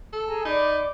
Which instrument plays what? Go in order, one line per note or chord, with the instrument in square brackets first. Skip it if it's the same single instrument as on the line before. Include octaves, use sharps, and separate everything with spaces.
[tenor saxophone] A4
[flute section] G#4 G#5 A#5
[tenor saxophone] D#4 [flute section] D5 B5 D6